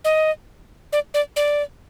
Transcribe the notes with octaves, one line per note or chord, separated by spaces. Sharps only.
D#5
D5
D5
D5